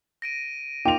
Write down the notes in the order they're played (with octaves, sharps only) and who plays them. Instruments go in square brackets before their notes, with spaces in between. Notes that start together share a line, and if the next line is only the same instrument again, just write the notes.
[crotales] A#6 D7 D#7
[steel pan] A#3 D#4 F4 [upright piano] G5 F7 [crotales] D6